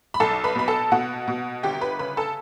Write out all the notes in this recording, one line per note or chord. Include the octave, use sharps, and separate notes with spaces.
B5
B1 A4 A5
B4 B5
B2 B5
A4 A5
B2 F#4 F#5
B2
G1 G4 G5
B4 B5
C#3 B4 B5
A4 A5